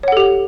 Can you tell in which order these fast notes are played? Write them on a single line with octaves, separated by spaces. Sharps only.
C#5 F#5 A4 G4